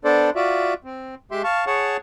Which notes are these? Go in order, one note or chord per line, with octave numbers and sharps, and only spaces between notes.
B3 D4 A4 C5 D5
F4 F#4 D5 E5
C4
G#3 G4 E5 C6
F5 A5 C#6
G#4 C#5 F#5 A5 C#6